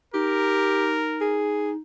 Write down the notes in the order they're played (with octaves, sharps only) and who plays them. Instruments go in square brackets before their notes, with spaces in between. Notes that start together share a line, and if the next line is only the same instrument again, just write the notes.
[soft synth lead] D#4 [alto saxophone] G4 [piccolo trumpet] A#4
[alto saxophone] G#4